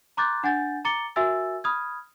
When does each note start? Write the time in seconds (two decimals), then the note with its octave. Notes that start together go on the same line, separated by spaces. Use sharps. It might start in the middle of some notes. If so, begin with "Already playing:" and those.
0.17 A#5 C6 D6 F#6 G6 A6
0.43 D4 F#5 G#5 G6 A6
0.85 A#5 D6 A6 C#7 G7
1.16 F#4 A#4 E5 G#5 E6 A6
1.64 B5 D#6 F6 G#6